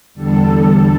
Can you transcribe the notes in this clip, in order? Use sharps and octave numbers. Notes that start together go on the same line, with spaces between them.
E2 D3 G3 A4